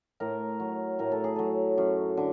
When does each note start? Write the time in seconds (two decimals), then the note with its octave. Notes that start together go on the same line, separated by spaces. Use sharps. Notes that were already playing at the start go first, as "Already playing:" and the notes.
0.20 A2 A#4
0.60 F#3
0.99 A2 A#4
1.12 A4
1.24 G#4
1.36 F#3 A4
1.78 F#2
2.17 D3